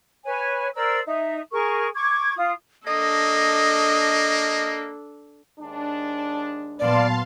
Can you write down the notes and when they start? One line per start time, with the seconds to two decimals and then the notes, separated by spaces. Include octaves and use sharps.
0.25 B4 C#5 G#5
0.74 A#4 C5 D5 E6
1.05 D#4 E5
1.51 G#4 A#4 C#6
1.94 C#6 D6 G#6
2.36 F4 D#6
2.87 A#3 D4 A4 D#5 D#6
5.59 D#2 G#3 D4
6.79 A#2 F#3 B3 D5 F5 A5 C6